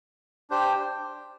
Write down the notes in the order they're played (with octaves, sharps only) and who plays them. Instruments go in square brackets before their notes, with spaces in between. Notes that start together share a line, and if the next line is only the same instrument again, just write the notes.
[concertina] D4 G4 C5 G5